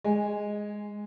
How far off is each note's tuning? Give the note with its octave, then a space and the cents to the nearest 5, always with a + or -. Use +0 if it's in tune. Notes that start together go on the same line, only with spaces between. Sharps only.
G#3 +0 G#5 -15